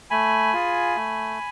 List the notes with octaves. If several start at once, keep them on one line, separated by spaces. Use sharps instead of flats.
A3 G#5 B5
F4 G#4
A3